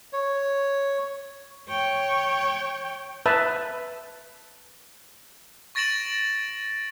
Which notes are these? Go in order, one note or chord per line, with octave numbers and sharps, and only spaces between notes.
C#5
C#5 G5
B4 E5 A5
C#6 A6 A#6 D7 E7 F#7